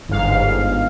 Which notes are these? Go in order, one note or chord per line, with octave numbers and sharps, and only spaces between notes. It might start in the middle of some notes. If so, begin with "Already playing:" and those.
G1 G#2 F5